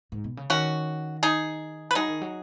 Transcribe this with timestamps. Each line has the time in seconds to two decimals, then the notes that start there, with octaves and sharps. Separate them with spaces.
0.12 G#2
0.24 B2
0.37 C#3
0.50 D#3 C#4 F#4
1.23 D#4 G#4
1.91 B4
1.95 F#3 D#4 G#4
2.08 D#3
2.21 F#3